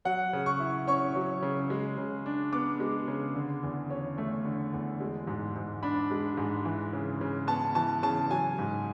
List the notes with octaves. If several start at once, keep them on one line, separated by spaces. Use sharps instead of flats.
F#3 F#5
C#3
C#6
E4
C#4 C#6
F#3
C#3
G#3
C#3
D4
B3 D6
G#3
C#3
D3
E2
C#4
A3
D3
E2
G#3
G#2
G#2
D4 B5
G#3
G#2
E3
C#3
C#3
B3 A5
E3 A5
C#3 A5
F#3 G#5
G#2